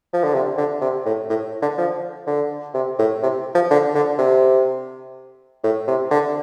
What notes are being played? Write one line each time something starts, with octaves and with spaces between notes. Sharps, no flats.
F3
D3
C3
D3
C3
A2
A2
D3
F3
D3
C3
A2
C3
F3
D3
D3
C3
A2
C3
D3